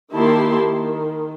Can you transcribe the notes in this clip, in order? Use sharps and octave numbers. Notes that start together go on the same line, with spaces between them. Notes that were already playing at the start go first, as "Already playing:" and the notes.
D#3 A#3 E4 G4 A5 C6
D#3